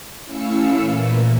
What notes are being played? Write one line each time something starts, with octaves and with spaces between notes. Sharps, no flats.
A3 C#4 E4 F5 E6 C#7
A#2 E3 A#3